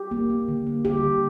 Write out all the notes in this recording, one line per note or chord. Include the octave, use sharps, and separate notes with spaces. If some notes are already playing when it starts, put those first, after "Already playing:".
Already playing: G4
A#3
A#3
D3
A#3
A#3 G4
D3